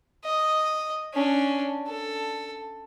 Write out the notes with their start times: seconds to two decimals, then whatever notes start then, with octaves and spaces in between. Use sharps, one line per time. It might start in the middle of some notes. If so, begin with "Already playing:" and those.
0.24 D#5
1.14 C#4 D4
1.88 A4